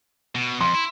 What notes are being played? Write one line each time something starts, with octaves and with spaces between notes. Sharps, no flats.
B2
F2 C6
E4